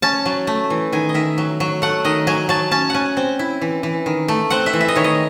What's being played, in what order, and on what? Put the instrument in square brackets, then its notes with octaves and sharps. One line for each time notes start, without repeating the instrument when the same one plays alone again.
[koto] C#4 A5
F#3
A3
E3
D#3 G#5
D#5
D#3 E5
F#3
F#3
A3 F#5
D#3 D#5
F#3 G#5
F#3 A5
C#4 A5
C#4 F#5 G#5
C4
E4
E3
E3
D#3
A3
C4 F#5
E5
E3
E5
D#5
D#3 C#5
D#5